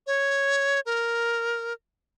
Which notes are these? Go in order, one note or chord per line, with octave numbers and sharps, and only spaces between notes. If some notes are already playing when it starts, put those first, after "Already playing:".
C#5
A#4